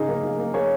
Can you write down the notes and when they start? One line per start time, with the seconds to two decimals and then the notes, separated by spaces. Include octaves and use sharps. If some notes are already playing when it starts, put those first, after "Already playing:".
Already playing: C#3 D#4 G#4
0.09 A#3
0.23 A#3
0.39 A#3
0.54 A#3 G#4 C#5